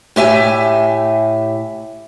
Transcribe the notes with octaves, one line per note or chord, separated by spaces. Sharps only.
A2 G4 E5 G#5